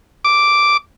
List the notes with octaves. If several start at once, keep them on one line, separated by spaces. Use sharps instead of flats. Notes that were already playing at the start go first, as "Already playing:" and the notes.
D6